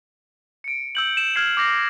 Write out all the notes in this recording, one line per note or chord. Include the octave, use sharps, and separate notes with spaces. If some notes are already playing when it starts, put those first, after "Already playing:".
C#7 D7
E6 G6 F#7
E7
F6 G#6 C7 E7
D6 G6 A#6 C7